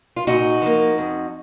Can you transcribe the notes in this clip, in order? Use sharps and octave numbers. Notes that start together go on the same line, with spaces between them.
F4
A#2 D#4 F#4
F3 A#3
F2